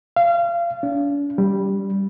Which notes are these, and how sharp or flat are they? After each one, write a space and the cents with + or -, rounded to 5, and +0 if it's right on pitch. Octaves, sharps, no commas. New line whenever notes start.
F5 -25
D4 -45
G3 +0